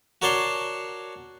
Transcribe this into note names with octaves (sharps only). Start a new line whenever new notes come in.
F#4 A#4 C#5 D5 A5 C6